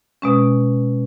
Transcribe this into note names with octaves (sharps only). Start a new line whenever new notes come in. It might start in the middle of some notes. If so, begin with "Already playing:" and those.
B2 G#3 C#4